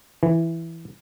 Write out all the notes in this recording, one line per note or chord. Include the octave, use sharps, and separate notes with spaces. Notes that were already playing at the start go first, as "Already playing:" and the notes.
E3